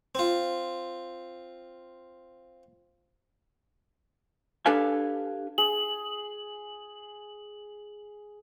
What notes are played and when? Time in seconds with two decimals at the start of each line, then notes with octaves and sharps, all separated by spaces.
0.15 C4 F4
4.66 D4 G4 A4 B4 F5 G#5
5.58 G#4 F#7